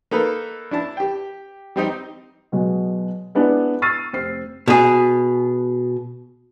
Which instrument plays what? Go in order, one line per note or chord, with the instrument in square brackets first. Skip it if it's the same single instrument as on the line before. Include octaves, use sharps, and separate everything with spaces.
[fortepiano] A#3 D#4 A4 B4
D4 E4 A5
G4 G5
G3 C4 D#4 G4
[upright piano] B2 F#3 G#3
G#3 B3 D4 E4
C#6 E6 F6 A6 C7 D#7
F1 C4 C7
[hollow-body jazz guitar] B2 G#4